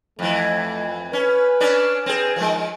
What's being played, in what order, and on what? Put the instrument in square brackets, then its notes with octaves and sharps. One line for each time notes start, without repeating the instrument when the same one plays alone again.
[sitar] F2 E3 [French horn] A3
[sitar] C#4 [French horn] B4
[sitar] C#4 D4 D5
[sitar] C4 G#4 [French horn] B4
[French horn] D#3 [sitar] F3 G#3